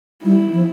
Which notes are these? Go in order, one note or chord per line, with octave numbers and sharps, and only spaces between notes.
G3 E4
F3